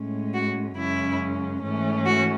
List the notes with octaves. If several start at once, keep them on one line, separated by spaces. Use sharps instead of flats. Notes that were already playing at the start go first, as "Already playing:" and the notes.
Already playing: A2 G#3 C#4
F#4
F#2 C#3 G#3 C#4 E4
G#2 E3 A3 C#4
F#4